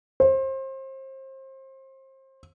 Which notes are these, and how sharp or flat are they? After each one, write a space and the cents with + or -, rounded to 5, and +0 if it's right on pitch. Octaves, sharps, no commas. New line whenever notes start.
C5 +30